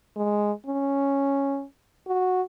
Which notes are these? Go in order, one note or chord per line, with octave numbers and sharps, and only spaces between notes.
G#3
C#4
F#4